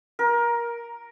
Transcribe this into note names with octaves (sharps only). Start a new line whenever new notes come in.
A#4